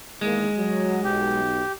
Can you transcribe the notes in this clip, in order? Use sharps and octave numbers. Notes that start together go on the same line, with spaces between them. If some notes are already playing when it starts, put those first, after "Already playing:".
E2 D#3 G#3 A#3
F#3
B1 G4